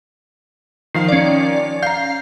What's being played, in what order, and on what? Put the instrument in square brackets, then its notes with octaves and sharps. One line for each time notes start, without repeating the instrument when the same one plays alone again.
[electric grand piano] D#3 F3 F5 [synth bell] C7
[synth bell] C#4 D5
[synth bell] F5 C7 [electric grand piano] A#5 G6